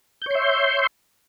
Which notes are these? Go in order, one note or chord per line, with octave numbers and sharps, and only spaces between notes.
C#5 E5 C6 G6